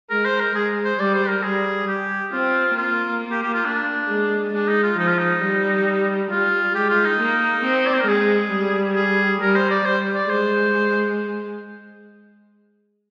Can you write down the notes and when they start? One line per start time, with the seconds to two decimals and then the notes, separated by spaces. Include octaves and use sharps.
0.10 G#3 A#4
0.25 C5
0.40 A#4
0.55 G#3 G#4
0.84 C5
1.00 G3 D5
1.14 C5
1.29 A#4
1.43 G3 G#4
1.87 G4
2.32 C4 F4
2.76 A#3 F4
3.31 G4
3.43 G4
3.54 F4
3.65 D4
4.09 G#3
4.53 G#3 D4
4.69 D#4
4.83 F4
4.98 F3 D#4
5.07 F4
5.18 D#4
5.42 G3
6.30 G3 F4
6.75 G#3 G4
6.90 F4
7.05 D#4
7.20 A#3
7.64 C4
7.86 D5
7.94 C5
8.01 A#4
8.08 G#3 G#4
8.52 G3
8.96 G#4
9.41 G3 A#4
9.56 C5
9.70 D5
9.85 G3 C5
10.15 D5
10.29 G#3 C5